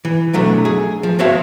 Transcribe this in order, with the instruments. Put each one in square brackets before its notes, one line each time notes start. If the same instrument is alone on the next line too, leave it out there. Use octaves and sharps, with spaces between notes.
[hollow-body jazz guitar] E3
B1 F#3 A3 D4
G#4
F3
F3 F#4 C5 C#5 E5 F5